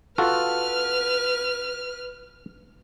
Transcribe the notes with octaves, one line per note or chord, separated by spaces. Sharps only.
F4 F#4 A4 B4 F6